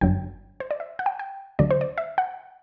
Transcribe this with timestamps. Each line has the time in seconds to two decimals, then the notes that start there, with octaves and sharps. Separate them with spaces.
0.01 G1 F#2 D3 F#3 G5
0.60 C5
0.71 D5
0.80 E5
0.99 F#5
1.06 G5
1.19 G5
1.59 D2 D3 F#3 D5
1.71 C5
1.81 D5
1.98 E5
2.18 F#5